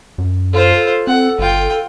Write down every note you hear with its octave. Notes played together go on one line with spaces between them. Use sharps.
F#2
F4 A4 C5
C4 F#5
G1 F4 G5